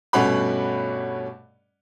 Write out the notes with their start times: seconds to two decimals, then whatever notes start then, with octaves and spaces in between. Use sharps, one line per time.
0.13 G2 B2 A3 C#4 F#5 B5